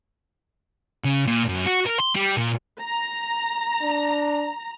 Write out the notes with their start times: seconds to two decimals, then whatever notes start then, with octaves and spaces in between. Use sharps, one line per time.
1.05 C#3
1.27 A#2
1.49 F#2
1.67 F#4
1.87 A#4
2.00 C6
2.16 G3
2.37 A#2
2.81 A#5
3.82 D4